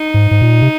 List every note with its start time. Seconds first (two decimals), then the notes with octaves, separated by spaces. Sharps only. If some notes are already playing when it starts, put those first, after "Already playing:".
Already playing: D#4
0.14 G#2
0.31 G#2
0.42 A#2
0.62 C3